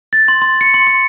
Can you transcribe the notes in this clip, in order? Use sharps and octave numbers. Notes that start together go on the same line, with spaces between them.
A6
C6
C6
C#7
C6
C6